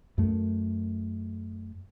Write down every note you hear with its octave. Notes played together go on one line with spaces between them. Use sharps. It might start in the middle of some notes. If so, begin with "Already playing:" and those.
F#2 A3